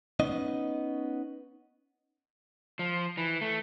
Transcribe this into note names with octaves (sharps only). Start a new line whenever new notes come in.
B3 C#4 D#4 D#5
F3
E3
A3